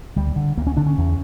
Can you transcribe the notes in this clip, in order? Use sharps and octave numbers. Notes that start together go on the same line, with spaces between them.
D2 G3
D3
D2 A#3
C#4
D3 D4
C#4
E2